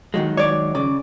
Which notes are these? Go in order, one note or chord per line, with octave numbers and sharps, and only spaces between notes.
D#3 F#3 G#3
C#5 D5
C#3 D5